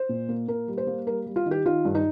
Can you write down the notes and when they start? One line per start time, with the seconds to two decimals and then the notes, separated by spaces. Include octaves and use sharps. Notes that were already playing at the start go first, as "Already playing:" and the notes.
Already playing: C5
0.09 A#2
0.29 A#3
0.48 A#2 A#4
0.68 G3
0.78 C5
0.87 A#3
1.07 G3 A#4
1.26 G3
1.36 F4
1.46 D#3
1.51 G4
1.65 D#3 F4
1.85 G2
1.95 D#4